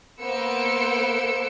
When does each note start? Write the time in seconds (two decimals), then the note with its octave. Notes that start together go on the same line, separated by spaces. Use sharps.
0.21 A#3 B3 C5 E6 C#7 D7